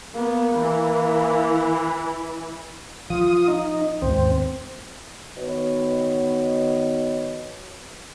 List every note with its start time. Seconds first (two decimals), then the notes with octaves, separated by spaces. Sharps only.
0.15 A#3 B3
0.54 E3
3.10 F3 F4 D#6
3.48 D#4
4.02 D#2 G#2 C4
5.37 D#3 B3 F#4 B4 C#5 D#5